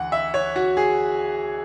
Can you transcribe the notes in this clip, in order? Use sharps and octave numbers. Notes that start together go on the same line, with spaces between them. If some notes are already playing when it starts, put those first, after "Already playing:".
Already playing: D2 E3 F#5
E5
C#5
F#4
G#4